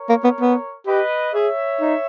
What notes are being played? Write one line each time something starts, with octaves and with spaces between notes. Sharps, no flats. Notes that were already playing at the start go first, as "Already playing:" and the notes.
Already playing: A#4 C#5
A#3
B3
B3
G4 B4 D#5
G#4 C#5 E5
D#4